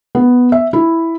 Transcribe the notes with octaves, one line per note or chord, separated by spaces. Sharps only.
B3
E5
E4